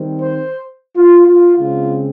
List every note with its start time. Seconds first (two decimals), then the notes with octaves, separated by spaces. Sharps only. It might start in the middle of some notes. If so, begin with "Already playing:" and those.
Already playing: D#3 G3 C4
0.20 C5
0.97 F4
1.27 F4
1.57 C#3 G#3 C4 F4